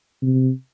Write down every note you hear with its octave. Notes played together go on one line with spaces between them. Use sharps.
C3